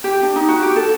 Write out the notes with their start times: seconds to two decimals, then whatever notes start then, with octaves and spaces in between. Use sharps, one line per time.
0.04 G4
0.23 D4
0.36 D#4
0.48 F#4
0.62 G4
0.76 A4